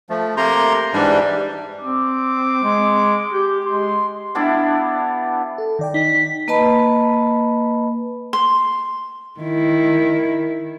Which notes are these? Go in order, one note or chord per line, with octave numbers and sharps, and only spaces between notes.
F3 A3
C3 A3 A#3 A#5 C6
G#2 E3 G3 D4
C4 D6
G#3
G4
G#3 C6
G3 B3 D4 E4
A4
D#3 D5 G5
D#4 B6
A#3 B4 D#5 A5 B5
C6
D#3 E4